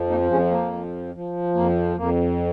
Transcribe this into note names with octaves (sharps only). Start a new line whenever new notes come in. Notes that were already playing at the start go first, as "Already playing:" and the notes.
Already playing: F2 F3
A#3 D#4
F2 G#3 C#4
A#3
F3
F3
F2 A#3
F2 A#3